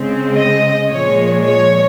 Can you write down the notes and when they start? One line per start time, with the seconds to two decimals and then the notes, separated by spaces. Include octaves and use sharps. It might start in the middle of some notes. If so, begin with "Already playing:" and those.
Already playing: C#3 G#3 C4
0.36 D#5
0.90 A#2 F3 G#3 C#5
1.44 C#5